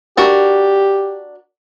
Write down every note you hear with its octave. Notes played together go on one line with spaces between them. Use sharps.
D4 F#4 G4 A#4